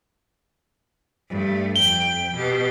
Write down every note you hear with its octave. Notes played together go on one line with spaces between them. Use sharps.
G2 A3
F2 G5 G7
B2 G4